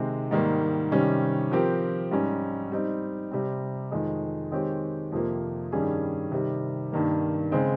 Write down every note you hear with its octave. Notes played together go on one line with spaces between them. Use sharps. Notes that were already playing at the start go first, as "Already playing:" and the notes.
Already playing: C3 D#3 G#3 C4
G#2 D#3 G3 A#3
C3 D#3 G3 C#4
F3 C4 G4 A#4
G#2 G3 C#4
G3 C4 D#4
C3 G3 C4
F2 D#3 G#3
D#3 G#3 C4 G4 C#5
F2 C3 F3 A#3
G2 D#3 G3 C#4 G#4
C3 D#3 G3
G2 D#3 A#3
C#3 G#3 C4